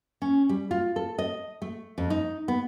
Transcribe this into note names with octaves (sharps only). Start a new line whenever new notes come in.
C#4
G3
F4
A4
D#5
A3
F2
D#4
B3